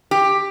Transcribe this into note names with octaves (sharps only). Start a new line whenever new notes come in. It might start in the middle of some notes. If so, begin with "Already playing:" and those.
G4